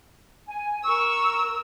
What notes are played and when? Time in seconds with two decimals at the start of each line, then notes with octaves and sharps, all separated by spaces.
0.48 G#5
0.83 A#4 C#6 E6